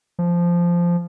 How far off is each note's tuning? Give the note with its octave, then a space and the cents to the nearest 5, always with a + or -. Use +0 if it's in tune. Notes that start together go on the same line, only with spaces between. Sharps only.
F3 -10